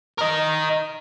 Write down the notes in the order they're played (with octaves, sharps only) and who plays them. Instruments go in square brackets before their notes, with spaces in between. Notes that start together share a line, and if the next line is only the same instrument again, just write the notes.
[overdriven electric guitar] A#4 D#5